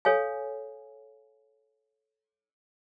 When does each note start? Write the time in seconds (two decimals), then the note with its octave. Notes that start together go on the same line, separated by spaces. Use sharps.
0.05 A4 C#5 F5 G#5